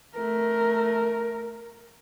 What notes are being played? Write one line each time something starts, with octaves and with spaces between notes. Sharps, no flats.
A3 A#4